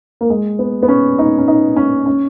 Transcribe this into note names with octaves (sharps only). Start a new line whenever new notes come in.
A#3
G#3
B3
B3
C#4
D#4
C#4
D#4
C#4
C#4